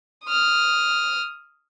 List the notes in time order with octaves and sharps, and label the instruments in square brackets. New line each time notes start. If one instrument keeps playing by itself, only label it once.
[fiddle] D#6 F6